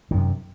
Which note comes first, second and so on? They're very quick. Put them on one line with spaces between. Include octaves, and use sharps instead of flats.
D#3 F#2 C3